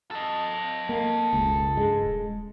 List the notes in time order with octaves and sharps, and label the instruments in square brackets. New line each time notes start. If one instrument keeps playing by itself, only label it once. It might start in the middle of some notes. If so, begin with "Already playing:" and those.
[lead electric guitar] A4 D#5
[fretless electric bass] A#3
[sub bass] E1 [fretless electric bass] C#2
[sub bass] G2 [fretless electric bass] G#3
[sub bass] D#1